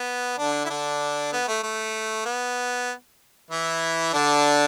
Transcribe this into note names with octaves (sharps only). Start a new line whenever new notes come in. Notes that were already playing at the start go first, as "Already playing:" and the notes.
Already playing: B3
D3 D4
E4
D3 D4
B3
A3
A3
B3
E3 E4
D3 D4